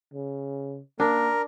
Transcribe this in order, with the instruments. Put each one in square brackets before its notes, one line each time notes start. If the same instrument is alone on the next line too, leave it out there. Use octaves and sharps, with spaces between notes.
[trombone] C#3
[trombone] A#3 [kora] D4 [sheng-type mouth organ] A#4